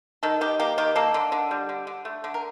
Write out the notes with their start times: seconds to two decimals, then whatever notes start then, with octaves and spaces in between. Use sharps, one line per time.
0.23 D#3 A4
0.41 D#3 G4
0.60 A#3 G4
0.78 D#3 G4
0.96 A#3 A4
1.14 D3
1.32 D3
1.51 G3
1.69 D3
1.87 D3
2.05 A3
2.24 D3
2.34 A#4